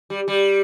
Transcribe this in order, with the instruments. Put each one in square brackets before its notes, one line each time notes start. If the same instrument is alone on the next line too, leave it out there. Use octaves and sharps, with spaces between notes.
[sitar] G3
G3